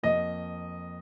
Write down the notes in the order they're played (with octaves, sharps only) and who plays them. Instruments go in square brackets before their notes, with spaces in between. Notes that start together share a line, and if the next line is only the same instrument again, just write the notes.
[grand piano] F2 F3 A#3 [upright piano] D#5